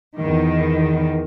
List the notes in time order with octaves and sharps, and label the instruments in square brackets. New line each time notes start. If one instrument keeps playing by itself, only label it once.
[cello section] E2 D#3